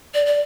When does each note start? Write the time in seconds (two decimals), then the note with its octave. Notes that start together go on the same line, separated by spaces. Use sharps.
0.14 D5
0.26 D5